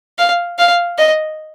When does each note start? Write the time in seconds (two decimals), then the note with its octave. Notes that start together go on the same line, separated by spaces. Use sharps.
0.18 F5
0.59 F5
0.98 D#5